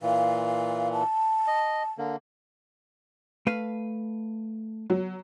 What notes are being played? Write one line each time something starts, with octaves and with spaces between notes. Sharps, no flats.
A#2 E3 F5
A5
D#5
D3 A#3
A3 B4 F5
F#3